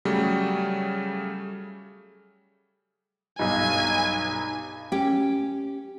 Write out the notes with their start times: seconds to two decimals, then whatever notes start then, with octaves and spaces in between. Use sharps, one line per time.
0.05 C#3 F#3 G3 A3
3.39 B1 G2 D#4 G#5
4.92 C#4 G4